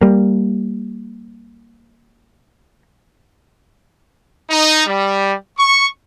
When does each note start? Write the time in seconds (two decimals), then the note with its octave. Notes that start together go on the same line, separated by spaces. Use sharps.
0.01 G3 A#3
4.51 D#4
4.87 G3
5.58 C#6